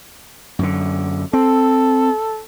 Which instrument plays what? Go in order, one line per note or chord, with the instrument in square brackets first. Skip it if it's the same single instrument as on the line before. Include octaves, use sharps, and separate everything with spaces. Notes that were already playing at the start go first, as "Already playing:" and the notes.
[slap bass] F#2 D3
[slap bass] C4 [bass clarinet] A4